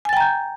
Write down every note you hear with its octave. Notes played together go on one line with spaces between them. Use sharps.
G5 G#5 A#5 G6 A6